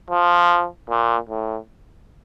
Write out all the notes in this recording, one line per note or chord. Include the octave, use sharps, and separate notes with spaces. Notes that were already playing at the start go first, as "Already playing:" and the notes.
F3
A#2
A2